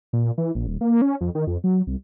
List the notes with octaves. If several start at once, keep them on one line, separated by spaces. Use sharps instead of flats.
A#2
E3
A#1
D#1
A#3
C#4
F2
D#3
F2
F#3
C2